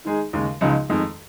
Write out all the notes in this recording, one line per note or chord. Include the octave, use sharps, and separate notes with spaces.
D#3 G#3 D#4 G#4
D#2 C#3 G#3
C#2 C#3 F3 G#3 D#4
F2 D#3 G#3